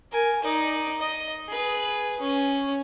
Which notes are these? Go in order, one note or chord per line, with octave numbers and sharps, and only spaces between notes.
A#4 G#5
D#4 D5
D#5
G#4 B4
C#4